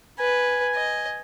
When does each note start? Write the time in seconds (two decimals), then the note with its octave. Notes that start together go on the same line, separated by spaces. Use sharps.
0.19 B4 G#5
0.75 D#5